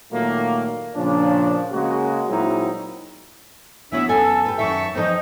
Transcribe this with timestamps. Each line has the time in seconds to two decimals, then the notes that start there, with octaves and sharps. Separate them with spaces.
0.12 A#2 D#3 F#3 A3 A#3
0.95 A#2 C#3 F3 C#4 D4
1.71 C#3 G#3 A#3 F#4
2.29 A#2 F#3 G#3 C4 D#4 E4
3.92 E3 B3 D4 F#4 C#5 E5
4.09 F#2 B3 A4 G#5
4.46 G4 B4
4.59 F#2 A#2 D#3 E5 A5 C#6
4.95 E3 F3 C4 D#4 A#4 D#5